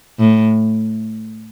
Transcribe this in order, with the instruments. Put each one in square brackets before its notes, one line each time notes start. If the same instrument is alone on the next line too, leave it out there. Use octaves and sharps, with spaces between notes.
[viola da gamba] A2